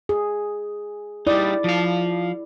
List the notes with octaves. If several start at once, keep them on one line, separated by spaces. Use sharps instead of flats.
G#4
G3 D#4 E4 D5
F3 F5